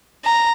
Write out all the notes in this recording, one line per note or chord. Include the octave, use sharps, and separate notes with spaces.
A#5